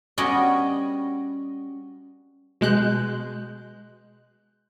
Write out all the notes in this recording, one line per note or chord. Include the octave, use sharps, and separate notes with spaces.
G3 B3 C#4 F#4 D5 D#5
B2 G#3 F#6 G6